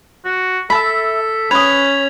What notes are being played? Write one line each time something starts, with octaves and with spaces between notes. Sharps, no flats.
F#4
A4 E5 A5 B5 B6
C#4 B4 B5 D#6 G#6 F7